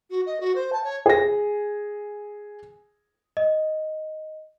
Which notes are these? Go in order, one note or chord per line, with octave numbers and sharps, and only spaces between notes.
F#4
D#5
F#4
C5
A5
C#5
G#4 A#6
D#5